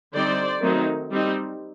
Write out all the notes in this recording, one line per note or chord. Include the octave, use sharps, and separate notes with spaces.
D3 G3 C4 D#4 C5 D5
D#3 F#3 A3 C4 D#4
G3 C4 D#4